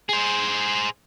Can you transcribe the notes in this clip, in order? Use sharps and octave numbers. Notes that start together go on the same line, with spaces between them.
G#4 C5